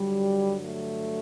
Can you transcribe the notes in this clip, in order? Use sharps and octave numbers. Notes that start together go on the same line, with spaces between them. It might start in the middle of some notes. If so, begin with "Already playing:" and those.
Already playing: G2 D3 F#3 G3
A3